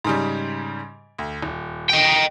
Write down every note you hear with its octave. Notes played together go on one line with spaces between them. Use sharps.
G#2 C#3 G3
D2
D#1
D#5 G5